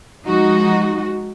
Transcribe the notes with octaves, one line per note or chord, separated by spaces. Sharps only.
F3 G#3 D#4 F#4